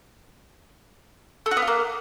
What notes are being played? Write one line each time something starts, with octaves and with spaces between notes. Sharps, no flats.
A3
F#4
B3
F4
A#3